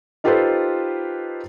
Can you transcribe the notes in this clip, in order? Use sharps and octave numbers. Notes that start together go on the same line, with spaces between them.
D#4 F4 G4 A4 B4 C5